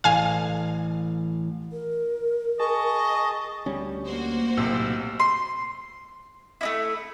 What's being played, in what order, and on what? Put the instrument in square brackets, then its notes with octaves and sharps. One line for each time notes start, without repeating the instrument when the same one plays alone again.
[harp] A1 [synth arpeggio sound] F5 G#5
[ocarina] A#4
[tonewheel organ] G#4 A5 [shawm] D#5 [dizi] C#6
[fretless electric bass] D2 G3 C#4
[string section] A#3 F#4 C5
[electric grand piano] B1 C3 E6 [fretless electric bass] A2
[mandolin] C6
A3 D#4 E4